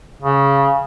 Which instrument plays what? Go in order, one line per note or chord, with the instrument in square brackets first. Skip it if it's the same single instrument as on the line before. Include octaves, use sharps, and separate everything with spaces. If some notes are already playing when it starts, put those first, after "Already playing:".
[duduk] C#3